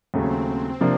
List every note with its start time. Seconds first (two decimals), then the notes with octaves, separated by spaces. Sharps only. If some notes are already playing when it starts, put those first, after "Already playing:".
0.14 D#2 C#3 F#3 A3 C4
0.80 C3 F3 A#3 D4